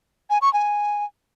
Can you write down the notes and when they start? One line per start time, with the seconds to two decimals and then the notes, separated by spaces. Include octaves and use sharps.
0.30 G#5
0.42 C#6
0.53 G#5